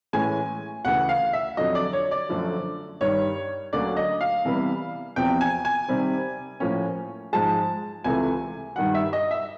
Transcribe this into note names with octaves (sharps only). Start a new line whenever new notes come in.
A2 E3 G#3 C#4 G#5
D2 C#3 E3 F#5
F5
E5
F2 D3 F#3 D#5
D5
C#5
D5
F#2 D3 F3 A3
G2 D#3 G3 C#5
D2 D3 F#3 A#3 C#4 D5
D#5
F5
C3 E3 G3 B3
E2 C3 F3 G5
G#5
G#5
C3 D#3 G3 C4
A2 F3 A#3 C#4
G#2 F3 G#3 A5
C#2 C3 E3 A3 G#5
G2 D#3 G3 F#5
E5
D#5
E5